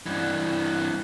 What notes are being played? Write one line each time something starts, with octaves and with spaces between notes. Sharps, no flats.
G2 E3